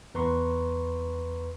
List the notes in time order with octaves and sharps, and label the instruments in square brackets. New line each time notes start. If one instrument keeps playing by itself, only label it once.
[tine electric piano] E2 B4 A#5 C6 C#6